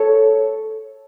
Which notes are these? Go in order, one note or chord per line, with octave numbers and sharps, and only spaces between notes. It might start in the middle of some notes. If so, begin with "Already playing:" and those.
Already playing: A4 C#5